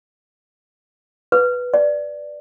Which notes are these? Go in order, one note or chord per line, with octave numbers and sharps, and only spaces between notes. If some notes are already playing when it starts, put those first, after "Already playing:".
B4
D5